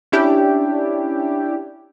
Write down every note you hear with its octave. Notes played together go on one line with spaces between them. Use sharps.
C#4 D4 E4 G4